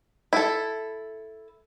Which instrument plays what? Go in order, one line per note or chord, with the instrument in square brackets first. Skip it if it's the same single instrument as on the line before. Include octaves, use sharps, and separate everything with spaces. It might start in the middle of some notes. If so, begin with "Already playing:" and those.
[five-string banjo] E4 A4